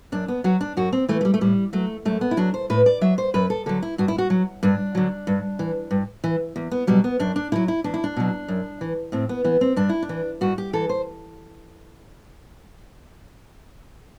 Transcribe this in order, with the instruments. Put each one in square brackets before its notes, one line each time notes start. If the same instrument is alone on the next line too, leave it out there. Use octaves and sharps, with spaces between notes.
[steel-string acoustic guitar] F#2 D4
B3
F#3 F#4
D4
F#2 F#4
C4
E3 A3
A3
G3
A3
A2 G3
F#3 A3
F#2 A3
B3
E4
F#3 D4
C5
A2 B4
D5
F#3 E5
C5
F#2 B4
A4
D3 F#3 A4
E4
G2 F#4
E4
F#4
F#3
G2 D4
D3 F#3
G2
E3
G2
E3
E2
B3
B2 F#3 G3
B3
F#2 D4
D4
D3 E4
F#3
E4
E2 D4
E4
D4
B2 F#3
F#2
E3
A2 C4
B3
E3 B3
C4
G2 D4
E4
D4
E3
G2 F#4
G4
E3 A4
C5